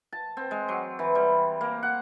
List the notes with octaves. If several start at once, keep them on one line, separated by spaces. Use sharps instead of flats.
A5
C4
G#3
F#3
E3
G3
A#3
F#5